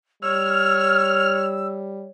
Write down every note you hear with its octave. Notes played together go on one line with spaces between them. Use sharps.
G3 C#5 E6 F6